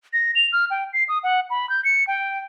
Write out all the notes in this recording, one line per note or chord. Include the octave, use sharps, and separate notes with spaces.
A#6
F7
F6
G5
C7
D#6
F#5
B5
G6
C#7
G5